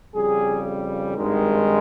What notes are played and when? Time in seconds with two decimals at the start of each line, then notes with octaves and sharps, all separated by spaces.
0.14 F2 C#3 G3 G#4
1.14 G#1 G2 D#3 G#3